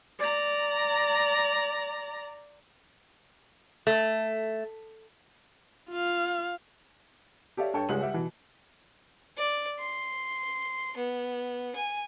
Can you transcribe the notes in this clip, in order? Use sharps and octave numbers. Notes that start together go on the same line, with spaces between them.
D5 A#5
A3
F4 F5
G4 A4 C#5 D5 E5 F5
G2 A4 C#5 G5
C#2 G3 G#3 C#4 F#5 F#7
G3 G4 E5 F#5
B2 E3
D5
C6
B3
G#5